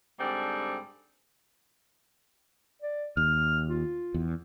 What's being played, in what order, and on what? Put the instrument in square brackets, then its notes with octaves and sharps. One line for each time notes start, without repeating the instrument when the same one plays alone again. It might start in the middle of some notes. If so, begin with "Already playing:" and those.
[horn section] G#2 D3 G3 C4 D4
[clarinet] D5
[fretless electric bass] D#2 [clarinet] F6
[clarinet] F4
[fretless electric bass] E2